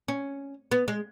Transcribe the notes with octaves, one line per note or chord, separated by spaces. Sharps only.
C#4
B3
G#3